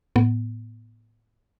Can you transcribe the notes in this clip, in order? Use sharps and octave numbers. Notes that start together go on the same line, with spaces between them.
A2 B3